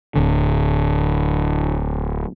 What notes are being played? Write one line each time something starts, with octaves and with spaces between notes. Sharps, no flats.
D1 D3